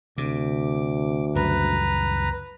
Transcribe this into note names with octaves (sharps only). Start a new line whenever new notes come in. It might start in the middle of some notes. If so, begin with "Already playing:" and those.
D2 C3 D6
C#2 F#2 G3 B4 A#5